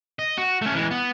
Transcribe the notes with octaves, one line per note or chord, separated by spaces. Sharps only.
D#5
F#4
A3 C#4
E3 G#3
B3